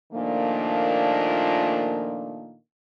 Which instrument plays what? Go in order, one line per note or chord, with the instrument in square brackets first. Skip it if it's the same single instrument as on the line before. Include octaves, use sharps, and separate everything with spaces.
[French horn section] A#2 D#3 F3 A3 A#3 D4